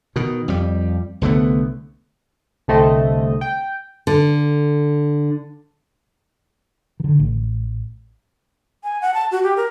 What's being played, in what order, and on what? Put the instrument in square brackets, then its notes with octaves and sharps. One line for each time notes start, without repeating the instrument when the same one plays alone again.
[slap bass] B2 D#3
F2 G3
C2 D3 A3 B3
[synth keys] C2 D3 A3 C4 D#5
G5
[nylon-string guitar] D3
[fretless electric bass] D3 D#3
A1
[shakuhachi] G#5
F#5
A5
F#4
G4
A#4